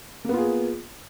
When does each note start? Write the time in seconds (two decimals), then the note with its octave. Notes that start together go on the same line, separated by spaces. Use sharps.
0.25 A#3
0.29 B3
0.34 F4
0.38 G#4